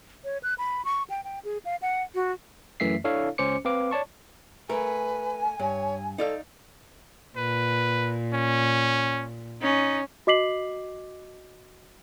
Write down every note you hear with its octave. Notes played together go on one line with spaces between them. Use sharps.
C#5
F#6
B5
C#6
G5
G5
G#4
F5
F#5
F#4
F#2 E3 A3 E5 B6 C7
D4 E4 A4 C#5 F5
C#2 C#4 C5 D6 C#7
C4 B4 F5 D6
C#5 D5 A5 C#6
A3 A#4 B4 G#5
G2 C#5
D#4 A4 D5 F5
A#2 B4
C#4
C#4 D#4
F#4 D#5 D6 B6 C7 F#7